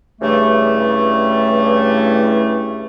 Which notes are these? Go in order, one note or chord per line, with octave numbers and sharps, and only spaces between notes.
G2 C#3 E3 A3